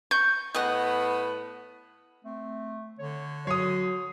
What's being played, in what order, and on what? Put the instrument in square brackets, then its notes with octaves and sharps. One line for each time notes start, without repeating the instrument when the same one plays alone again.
[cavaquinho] C#6 [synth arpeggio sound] G6
[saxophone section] A2 B3 [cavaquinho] D#5 F#5
[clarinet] A3 [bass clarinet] C4
[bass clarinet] D3 [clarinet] C#5
[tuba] F#3 [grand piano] C#5 D#6 [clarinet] C6